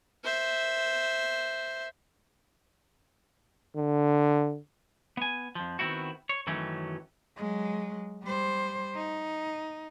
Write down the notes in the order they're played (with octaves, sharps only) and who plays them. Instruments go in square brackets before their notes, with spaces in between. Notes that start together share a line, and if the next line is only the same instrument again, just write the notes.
[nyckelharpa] C5 E5
[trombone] D3
[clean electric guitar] B3 G#5
F2 F3
D#3 B3 C4 E4 F#4
C#5
F#2 D#3 E3 F#3 A3 C#4
[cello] F#3 G#3
G3 C5
D#4